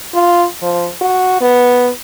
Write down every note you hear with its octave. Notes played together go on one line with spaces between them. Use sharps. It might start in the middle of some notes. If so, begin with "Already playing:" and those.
F4
F3
F#4
B3